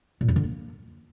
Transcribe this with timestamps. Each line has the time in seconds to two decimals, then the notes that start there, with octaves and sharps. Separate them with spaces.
0.21 A#2
0.28 F2
0.36 D3
0.43 A#3